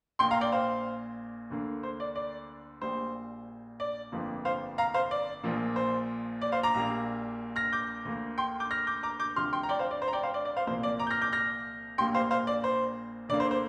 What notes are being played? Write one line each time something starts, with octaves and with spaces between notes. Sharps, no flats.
A#1 A#2 A#3 G5 C6
F5 A#5
D5 G5
C5 F5
D2 D3 A#3
C5
D5
D5
A#1 A#2 G3 C5
D5
G1 F2 F3 A#3
C5 F5
F5 A#5
C5 F5
D5
A#1 A#2 F3 A#3
C5
D5
C5 F5
A#5 D6
A#1 A#2 G3 A#3
F6 A#6
D6 G6
D2 D3 A#3
G5 C6
D6 G6
F6 A#6
D6 G6
A#5 D6
D6 G6
D2 C3 F3 C6 F6
G5 C6
A#5
D5 G5
C5 F5
D5
C5
A#5
D5 G5
C5 F5
D5
D5
C5 F5
C2 A#2 F3 A#3 C5
D5
A#5 D6
G6
F6 A#6
D6 G6
F6 A#6
A#1 A#2 G3 A#3 G5 C6
C5 F5
C5 F5
D5
C5
D2 D3 A#3 D5
C5
C5